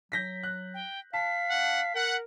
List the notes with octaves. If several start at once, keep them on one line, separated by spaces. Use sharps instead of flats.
F#3 G6 A#6 B6
F#6
G5
F5 A5 B6
D4 F#5
A#4 F#5